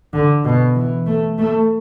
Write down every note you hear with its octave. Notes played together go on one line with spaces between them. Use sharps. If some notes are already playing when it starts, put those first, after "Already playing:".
D3
B2
E3
A3
A3